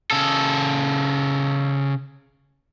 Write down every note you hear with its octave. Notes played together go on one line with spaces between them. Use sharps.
C#3 A4